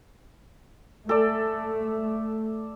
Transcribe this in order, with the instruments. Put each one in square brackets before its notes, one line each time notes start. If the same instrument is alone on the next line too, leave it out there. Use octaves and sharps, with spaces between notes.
[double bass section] A3 [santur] A4 D5